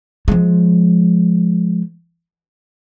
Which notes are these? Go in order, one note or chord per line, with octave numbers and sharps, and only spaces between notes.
F3 G#3